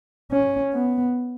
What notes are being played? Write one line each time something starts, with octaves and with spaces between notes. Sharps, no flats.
C#4
B3